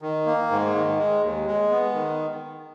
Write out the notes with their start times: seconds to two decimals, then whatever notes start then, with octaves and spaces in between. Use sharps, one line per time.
0.02 D#3
0.26 A#3
0.51 G#2
0.74 D#3
0.98 G#3
1.22 D#2
1.47 G#3
1.70 B3
1.94 D#3